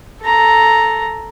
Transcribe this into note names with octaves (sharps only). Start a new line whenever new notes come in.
A4 A#5